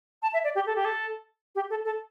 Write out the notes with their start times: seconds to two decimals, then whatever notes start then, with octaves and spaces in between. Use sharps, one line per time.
0.22 A5
0.33 E5
0.44 D5
0.55 G4
0.66 A4
0.76 G4
0.85 A4
1.55 G4
1.70 A4
1.84 A4